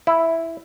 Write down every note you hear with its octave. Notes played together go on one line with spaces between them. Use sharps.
E4